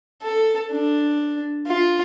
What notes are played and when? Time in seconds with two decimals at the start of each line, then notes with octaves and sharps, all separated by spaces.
0.23 A4
0.72 D4
1.67 F4